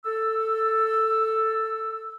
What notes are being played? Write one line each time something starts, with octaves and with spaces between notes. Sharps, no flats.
A4 E6